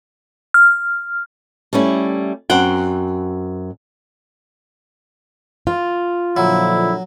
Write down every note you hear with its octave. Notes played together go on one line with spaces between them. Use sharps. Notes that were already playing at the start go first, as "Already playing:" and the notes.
F6
G3 A3 C#4 E4
F#2 C4 F#5 G5
F4
A#2 D3 F3 F#3 E4